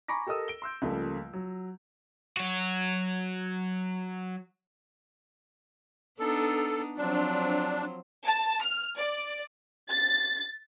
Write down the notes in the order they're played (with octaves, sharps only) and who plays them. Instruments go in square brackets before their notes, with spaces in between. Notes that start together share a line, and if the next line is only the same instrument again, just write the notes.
[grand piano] G#5 A#5 B5 C#6 D6 A#6
G4 A4 A#4 D#5 D#6 E6
D7 G7
C6 E6 G6
C#2 C#3 F3 G3 A3 A#3
F#3
[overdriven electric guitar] F#3 F#4
[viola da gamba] B3 D4 D#4 [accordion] A4
[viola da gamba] F3 F#3 C4 [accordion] D4
[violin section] A5
F6
D5
A6